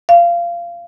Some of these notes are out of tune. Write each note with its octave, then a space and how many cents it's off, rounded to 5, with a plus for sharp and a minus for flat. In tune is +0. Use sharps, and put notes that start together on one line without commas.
F5 -20